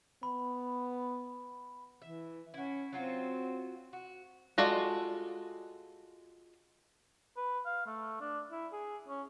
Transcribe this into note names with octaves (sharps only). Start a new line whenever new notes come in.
B3 B5
E3 E5
C#4 E4 F#4
F#3 C4 F4 F#4
F#4
G#3 F4 F#4 A4 D5
B4
F5
A3
D4
E4
G#4
C#4